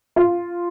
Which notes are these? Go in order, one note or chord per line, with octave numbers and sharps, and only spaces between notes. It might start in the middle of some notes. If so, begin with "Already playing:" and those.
F4